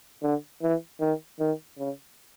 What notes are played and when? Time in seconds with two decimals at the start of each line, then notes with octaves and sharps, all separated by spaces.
0.22 D3
0.62 E3
1.00 D#3
1.40 D#3
1.78 C#3